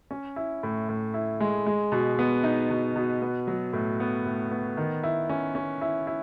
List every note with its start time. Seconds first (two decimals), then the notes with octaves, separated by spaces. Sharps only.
0.11 C#4
0.36 E4
0.63 A2
0.89 A2
1.14 E4
1.40 G#3
1.66 G#3
1.92 B2
2.19 B3
2.44 D#4
2.70 B2
2.96 B2
3.22 B3
3.47 F#3
3.73 A2
4.00 B3
4.25 A2
4.51 B3
4.77 D#3
5.04 E4
5.30 C#4
5.55 C#4
5.81 E4
6.07 E4